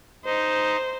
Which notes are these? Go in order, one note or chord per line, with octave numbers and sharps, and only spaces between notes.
D#4 C5